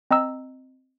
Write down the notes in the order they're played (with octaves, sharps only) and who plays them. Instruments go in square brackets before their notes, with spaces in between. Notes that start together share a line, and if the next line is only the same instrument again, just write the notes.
[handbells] C4 D#5 A#5 E6